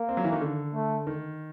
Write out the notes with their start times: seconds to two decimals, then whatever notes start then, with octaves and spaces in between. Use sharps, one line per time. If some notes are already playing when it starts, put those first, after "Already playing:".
Already playing: A#3
0.09 C4
0.17 F#3
0.24 E3
0.32 D#3
0.41 D3
0.74 A3
1.07 D#3